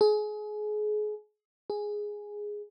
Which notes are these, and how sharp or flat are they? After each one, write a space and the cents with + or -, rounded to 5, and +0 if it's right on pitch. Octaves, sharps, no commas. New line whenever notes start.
G#4 +30
G#4 +0